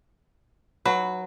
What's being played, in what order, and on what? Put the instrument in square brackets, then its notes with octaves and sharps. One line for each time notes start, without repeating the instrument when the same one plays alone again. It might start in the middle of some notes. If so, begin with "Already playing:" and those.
[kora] F#3 [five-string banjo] B4